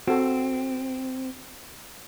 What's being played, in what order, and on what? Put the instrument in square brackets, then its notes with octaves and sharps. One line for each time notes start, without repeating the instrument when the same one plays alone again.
[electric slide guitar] C4 [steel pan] F#4 A4